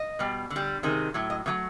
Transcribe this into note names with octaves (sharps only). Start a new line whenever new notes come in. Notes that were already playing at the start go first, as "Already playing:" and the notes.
Already playing: D#5
B2 G3
D3
G3
C3 D#3 G#3
A2 F#3
D#5
B2 F#3 A3